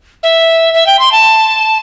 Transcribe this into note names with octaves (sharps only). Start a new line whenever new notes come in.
E5
E5
G5
C6
A5